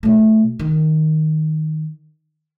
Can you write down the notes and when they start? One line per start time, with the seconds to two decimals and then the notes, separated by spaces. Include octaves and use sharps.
0.03 B2 A3
0.59 D#3